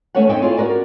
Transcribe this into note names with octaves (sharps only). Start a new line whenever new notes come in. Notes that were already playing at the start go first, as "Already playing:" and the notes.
E2 A3 C#4 A4 C#5 F#5
C4 D#4 C#5 D#5 E5 G5
E4 F4 G#4 A4 C#5 D5
C#4 F#4 A#4 D5